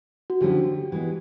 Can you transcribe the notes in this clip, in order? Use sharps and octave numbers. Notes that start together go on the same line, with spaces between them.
F#4
D3 F3 A3 C#4 E4 G4
E3 G#3 B3